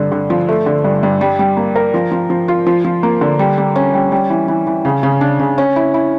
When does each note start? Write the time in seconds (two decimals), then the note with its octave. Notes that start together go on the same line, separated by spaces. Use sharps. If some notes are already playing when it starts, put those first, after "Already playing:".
Already playing: G2 D3
0.12 D3
0.30 F3
0.49 A3
0.66 D3
0.84 G2
1.03 G2
1.21 G3
1.39 G3
1.57 A#3
1.76 A#4
1.94 F3
2.11 F3
2.30 F3
2.48 F4
2.67 F3
2.84 F3
3.03 A#3
3.21 D3
3.39 G3
3.58 G3
3.76 C#4
3.94 G3
4.12 G3
4.30 E3
4.48 E3
4.67 E3
4.85 C#3
5.03 C#3
5.21 D4
5.40 C#3
5.58 C#4
5.76 E4
5.94 E4